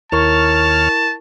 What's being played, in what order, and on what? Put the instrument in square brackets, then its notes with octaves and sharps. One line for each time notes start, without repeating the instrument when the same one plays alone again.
[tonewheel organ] D#2 C#5 F6 [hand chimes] E4 A#4 C#6 [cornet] A5